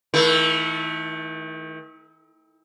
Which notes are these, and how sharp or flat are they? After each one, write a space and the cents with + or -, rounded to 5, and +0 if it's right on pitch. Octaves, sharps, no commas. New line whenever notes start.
D#3 +40 A3 -15 E4 +25